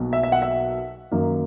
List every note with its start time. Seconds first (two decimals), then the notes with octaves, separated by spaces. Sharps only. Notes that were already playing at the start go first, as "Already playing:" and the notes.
Already playing: B1 B2 F#3 A#3
0.13 E5
0.23 E5
0.32 F#5
0.42 E5
1.11 F#2 D#3 A#3